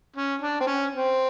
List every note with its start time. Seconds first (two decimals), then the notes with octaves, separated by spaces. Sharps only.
0.16 C#4
0.42 D4
0.61 C4
0.67 C#4
0.93 C4